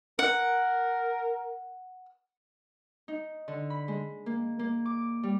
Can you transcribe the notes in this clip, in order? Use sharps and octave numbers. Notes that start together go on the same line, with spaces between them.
A#4 F#5
D#4
D3
B5
G#3
A#3
A#3
D6
G3